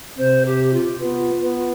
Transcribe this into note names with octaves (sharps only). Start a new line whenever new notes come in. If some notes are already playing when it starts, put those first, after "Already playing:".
C3 C5
G4
F4
B3 F4
B3